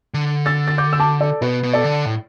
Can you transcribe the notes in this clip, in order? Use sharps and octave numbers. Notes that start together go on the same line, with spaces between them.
D3
E6 A6
A6
D6 G6
E6
A5 D6
A4 D5
B2 B4
B2
A4 D5
D3
A2